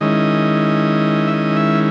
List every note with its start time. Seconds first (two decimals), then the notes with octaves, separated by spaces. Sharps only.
0.01 D#3 G#3 C#4 E4 D#5
1.27 E5
1.34 D#5
1.56 E5